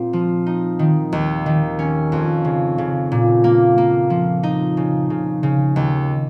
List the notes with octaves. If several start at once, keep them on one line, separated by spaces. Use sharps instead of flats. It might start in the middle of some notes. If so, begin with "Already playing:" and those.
Already playing: A#2 C4
F3
D#4
D#3
D#2
D#3
C#4
F2
C#3
C#3
A#2
A#3
A#3
F3
D#4
C#3
C#3
C#3
D#2